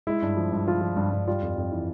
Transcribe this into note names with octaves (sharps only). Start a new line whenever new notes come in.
G#3 E4
G2
F3
G2
F3 F4
F3
G2
G2
G3 F4
F2
F2
E3